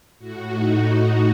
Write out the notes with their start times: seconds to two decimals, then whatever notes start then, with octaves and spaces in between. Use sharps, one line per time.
0.19 A2 F#4
0.50 D#4
0.79 D#4